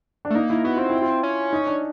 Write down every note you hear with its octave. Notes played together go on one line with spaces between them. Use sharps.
D4
A3
A#3 D#4
E4
B3 F#4
C4 F4
E4
F4
C#4
D#4
D4